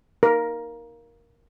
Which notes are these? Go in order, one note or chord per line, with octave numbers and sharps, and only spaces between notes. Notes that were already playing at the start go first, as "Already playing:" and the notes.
A#4